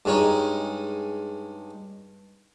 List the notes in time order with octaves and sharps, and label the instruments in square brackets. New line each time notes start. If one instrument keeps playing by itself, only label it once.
[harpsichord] G2 G#3 C#4 D#4